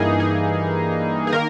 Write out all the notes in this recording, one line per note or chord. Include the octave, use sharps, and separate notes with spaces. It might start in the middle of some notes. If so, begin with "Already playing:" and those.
Already playing: G2 E3 A#3 D#4 G#4
G#4
G#4
D#3 A#3 A#4